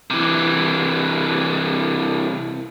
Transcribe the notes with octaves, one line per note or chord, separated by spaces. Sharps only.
C3 E3